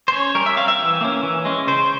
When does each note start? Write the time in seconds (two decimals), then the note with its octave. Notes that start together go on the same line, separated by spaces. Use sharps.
0.08 C5
0.12 C#4 C#5
0.35 G3 A#4
0.46 E5
0.57 C4 F5
0.68 E5
0.79 E3
1.01 A#3 C#4
1.23 E3
1.45 G#3 C#4
1.67 C#3 C5